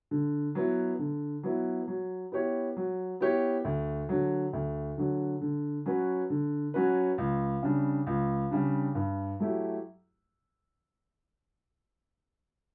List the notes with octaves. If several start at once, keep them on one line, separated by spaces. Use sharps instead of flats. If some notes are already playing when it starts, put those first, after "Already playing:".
D3
F#3 B3 E4
D3
F#3 B3 E4
F#3
B3 E4 G4 C#5
F#3
B3 E4 G4 C#5
D2
D3 F#3
D2
D3 F#3
D3
F#3 C#4 F#4 B4
D3
F#3 C#4 F#4 B4
C#2
C#3 G3 D4
C#2
C#3 G3 D4
G2
F#3 A3 E4 G4